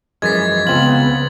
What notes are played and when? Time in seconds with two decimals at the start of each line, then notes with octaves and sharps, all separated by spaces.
0.22 F#2 E3 F3 G#3 G#6 A6 B6
0.67 C#2 C#3 B3 C4 F4 G#6 F#7